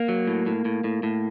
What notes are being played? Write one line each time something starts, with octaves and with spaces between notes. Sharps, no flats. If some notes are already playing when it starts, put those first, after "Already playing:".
Already playing: A#3
F#3
A2
A2
A2
A2
A2